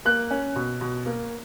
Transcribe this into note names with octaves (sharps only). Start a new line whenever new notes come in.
A#3 F#6
C#4
B2
B2
A#3